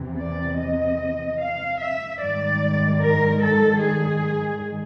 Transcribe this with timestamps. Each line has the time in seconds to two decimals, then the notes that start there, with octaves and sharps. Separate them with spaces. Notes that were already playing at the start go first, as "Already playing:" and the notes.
Already playing: E2 C3 E3
0.19 D5
0.60 D#5
1.39 F5
1.80 E5
2.20 G#2 D#3 G3 D5
2.99 A#4
3.40 A4
3.80 G#4